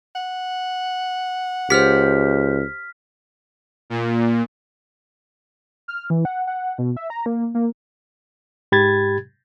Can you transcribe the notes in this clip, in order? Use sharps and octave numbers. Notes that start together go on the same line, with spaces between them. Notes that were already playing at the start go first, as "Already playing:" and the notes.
F#5
C#2 G4 C5 F6 B6
A#2
F6
E3
F#5
F#5
B2
E5
A#5
A#3
A#3
G#2 G4 B5 G#6 A6